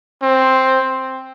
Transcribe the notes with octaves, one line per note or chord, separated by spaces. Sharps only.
C4